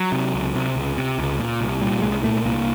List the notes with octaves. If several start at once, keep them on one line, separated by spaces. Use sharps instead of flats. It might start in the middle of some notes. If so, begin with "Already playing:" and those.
Already playing: F#3
C3
C#2
C3
C#2
C3
C#2
A#2
C2
A#2 G3
G3
C2 G#3
A#2 A3
C2 A#3